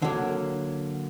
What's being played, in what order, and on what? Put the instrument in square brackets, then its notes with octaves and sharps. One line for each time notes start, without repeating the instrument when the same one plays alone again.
[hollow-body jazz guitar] D3 F#3 A#3